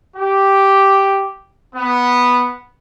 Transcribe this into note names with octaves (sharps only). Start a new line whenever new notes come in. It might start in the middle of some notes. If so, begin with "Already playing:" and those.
G4
B3